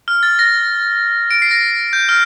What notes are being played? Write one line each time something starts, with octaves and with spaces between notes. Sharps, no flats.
F6
A6
A#6
D7
C7
A#6
G6
F6